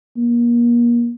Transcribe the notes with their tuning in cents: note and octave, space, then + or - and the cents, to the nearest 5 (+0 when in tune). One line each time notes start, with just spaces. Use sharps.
A#3 +35